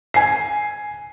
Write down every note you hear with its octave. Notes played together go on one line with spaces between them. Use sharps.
G#5 C7